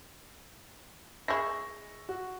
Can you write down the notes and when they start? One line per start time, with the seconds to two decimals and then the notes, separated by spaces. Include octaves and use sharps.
1.28 G#3 E4 C#6 E6 A#6
2.09 F#4